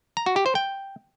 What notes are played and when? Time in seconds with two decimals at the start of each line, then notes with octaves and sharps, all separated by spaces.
0.17 A#5
0.26 F#4
0.36 G4
0.46 C5
0.55 G5